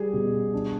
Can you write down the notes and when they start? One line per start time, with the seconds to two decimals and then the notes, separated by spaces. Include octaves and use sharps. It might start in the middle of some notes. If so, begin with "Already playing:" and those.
Already playing: G3 G#4
0.13 B2
0.53 D4